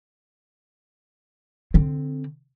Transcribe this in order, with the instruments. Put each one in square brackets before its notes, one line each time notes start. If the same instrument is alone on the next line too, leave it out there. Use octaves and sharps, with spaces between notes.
[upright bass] D3 C4